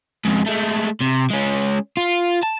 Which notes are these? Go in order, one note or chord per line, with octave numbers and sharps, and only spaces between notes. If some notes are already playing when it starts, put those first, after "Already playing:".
F2 G#2
G#3 A3
C3
G#3 C#4
F4
A5